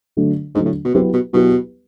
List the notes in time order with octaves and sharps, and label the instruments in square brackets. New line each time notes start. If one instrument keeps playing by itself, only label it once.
[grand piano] D3 F#3 A3 D4
[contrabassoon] G#2 [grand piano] D3 F#3 A3 D4
[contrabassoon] A2
B2
[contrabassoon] C3 [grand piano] F#3 B3 E4 G4 B4
[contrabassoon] B2
[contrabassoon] B2 [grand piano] F#3 B3 E4 G4 B4